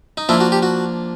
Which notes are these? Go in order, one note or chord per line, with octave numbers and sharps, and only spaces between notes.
D#4
F3 A#3 D4 E4
F#4
G4
F#4